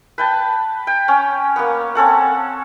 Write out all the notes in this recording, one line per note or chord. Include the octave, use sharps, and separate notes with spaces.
B4 G5 A5
G5
C#4
A#3 B3
C4 C#4 A4 F#5